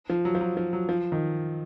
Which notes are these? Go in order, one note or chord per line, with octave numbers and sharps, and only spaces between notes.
F3
F#3
F3
F#3
F3
F#3
F3
D#3